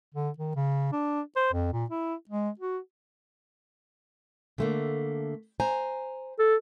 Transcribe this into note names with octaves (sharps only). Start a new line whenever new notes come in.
D3
D#3
C#3
D4
C5
F2
A#2
E4
G#3
F#4
D3 A3 A#3
C5 G#5 A#5
A4